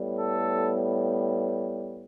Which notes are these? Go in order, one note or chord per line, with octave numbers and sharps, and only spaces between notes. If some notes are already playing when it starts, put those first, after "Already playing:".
Already playing: A2 G3 B3
A4